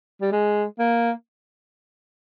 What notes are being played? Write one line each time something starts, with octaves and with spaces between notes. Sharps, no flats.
G3
G#3
A#3